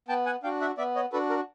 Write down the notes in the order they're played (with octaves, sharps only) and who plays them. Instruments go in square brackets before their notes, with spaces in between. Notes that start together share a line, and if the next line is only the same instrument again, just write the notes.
[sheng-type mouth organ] B3 G5 A5
F#5 G#5
D4 F#4 F5 G5
E5 F#5
B3 D5 E5
C#5 D#5
D4 F#4 A4 B4
A#4